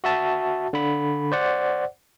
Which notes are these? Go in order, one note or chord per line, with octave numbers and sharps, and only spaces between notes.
F#4 E5 A5
D3 B5
C5 D5 F#5